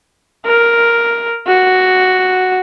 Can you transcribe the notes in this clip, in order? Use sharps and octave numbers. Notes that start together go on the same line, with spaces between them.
A#4
F#4